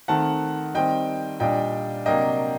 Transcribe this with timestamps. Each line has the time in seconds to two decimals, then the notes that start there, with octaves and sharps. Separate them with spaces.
0.08 D#3 A3 C4 F#5 A5
0.75 D#3 G3 C4 D#5 G5
1.40 A#2 G3 D4 D#5 G5
2.06 C3 F#3 A#3 D4 D#5 G5